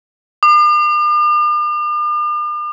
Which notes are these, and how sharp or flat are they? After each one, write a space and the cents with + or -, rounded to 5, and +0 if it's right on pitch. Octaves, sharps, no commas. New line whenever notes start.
D6 +45